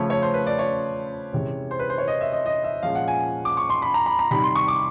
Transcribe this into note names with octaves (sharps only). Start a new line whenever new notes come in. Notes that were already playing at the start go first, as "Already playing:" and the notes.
Already playing: C#3 F3 A3 C#4 C#5
C#5
C5
B4
D5
C#5
C3 E3 G#3 C#4
C5
B4
C5
C#5
D#5
E5
D#5
D#5
E5
A#2 F3 G#3 C#4 F5
F#5
G#5
D6
C#6
C6
B5
A#5
B5
A#5
C3 D#3 G3 C4 B5
C6
C#6
D6